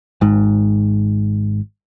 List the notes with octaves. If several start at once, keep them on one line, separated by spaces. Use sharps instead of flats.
G#1 G#2